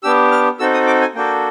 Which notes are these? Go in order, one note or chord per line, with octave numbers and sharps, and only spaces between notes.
B3 D4 G4 E6
F6
C4 D#4 F#4 A4 E6
D#6
D6
G#5
A#3 D4 F#4 A4 G5